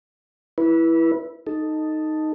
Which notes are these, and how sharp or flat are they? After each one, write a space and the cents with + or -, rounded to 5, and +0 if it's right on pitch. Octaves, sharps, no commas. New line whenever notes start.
E4 +0 B4 -25
D#4 -5 A4 +0